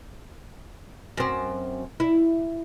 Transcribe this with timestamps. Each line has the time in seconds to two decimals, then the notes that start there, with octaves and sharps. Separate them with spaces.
1.18 F#2 C4
2.00 E4